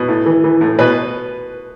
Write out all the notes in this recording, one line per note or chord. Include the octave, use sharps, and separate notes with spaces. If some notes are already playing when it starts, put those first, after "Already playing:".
Already playing: B2
A2
E3
E3
A2
B2 B4